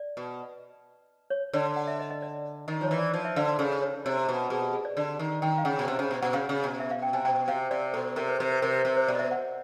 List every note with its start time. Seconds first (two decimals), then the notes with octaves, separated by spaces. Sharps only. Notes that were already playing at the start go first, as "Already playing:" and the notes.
Already playing: D5
0.17 B2
1.30 C#5
1.53 D3 C#5
1.76 F#5
1.88 E5
1.99 D#5
2.10 D#5
2.22 D5
2.68 D#3 D#5
2.81 F3 C#5
2.91 E3
2.98 D5
3.14 F3
3.25 E5
3.36 D3 F5
3.48 D5
3.59 C#3 A4
3.82 C#5
4.05 C3 C#5
4.29 B2
4.50 B2 G#4
4.62 G4
4.74 G#4
4.85 D5
4.97 D3 D5
5.19 D#3
5.42 D#3 G5
5.58 F5
5.65 C#3 F#5
5.79 B2
5.88 C3
5.99 C#3
6.11 B2
6.22 B2 F#5
6.33 C#3 F5
6.49 C#3
6.64 B2
6.80 E5
6.91 F5
7.02 G5
7.13 C3 G#5
7.25 B2 G5
7.48 C3 F5
7.71 C3 D5
7.94 B2 A4
8.16 C3 A#4
8.28 B4
8.40 C3 B4
8.51 B4
8.62 C3 A#4
8.73 B4
8.85 C3
8.97 C5
9.08 B2 D5
9.15 D#5
9.19 E5
9.31 F#5